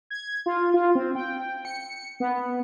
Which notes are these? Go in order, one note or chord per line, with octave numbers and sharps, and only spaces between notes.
G#6
F4
F4
C4
G5
C#7
B3